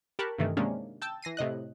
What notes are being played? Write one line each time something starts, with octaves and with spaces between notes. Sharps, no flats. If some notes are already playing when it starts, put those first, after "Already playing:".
G4 A#4 A5 B5 C#6 F#6
G2 C3 D#3 E3 A3
C3 D#3 G#3 A#3 C#4 D4
G5 A5 E6 G6 A6
E3 A#6 C7 D#7
A2 C3 D#5 F#6